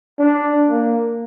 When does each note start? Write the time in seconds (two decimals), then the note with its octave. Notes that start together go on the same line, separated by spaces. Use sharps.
0.19 D4
0.69 A#3